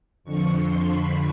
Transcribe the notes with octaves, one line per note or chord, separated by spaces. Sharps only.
F2 D3 F3 C#6
C6
B5